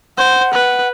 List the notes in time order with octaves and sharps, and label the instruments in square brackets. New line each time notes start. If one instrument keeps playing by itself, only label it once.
[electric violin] C5 [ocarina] F#5
[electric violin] B4